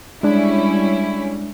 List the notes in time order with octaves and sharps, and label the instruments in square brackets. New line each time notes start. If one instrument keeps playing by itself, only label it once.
[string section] G3 C#4 E4 [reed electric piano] G#3 D4